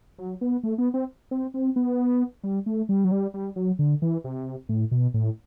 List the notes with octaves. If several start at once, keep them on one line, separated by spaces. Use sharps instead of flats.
F#3
B3
A3
B3
C4
C4
C4
B3
G3
A3
G3
F#3
G3
G3
F#3
D3
E3
C3
A2
B2
A2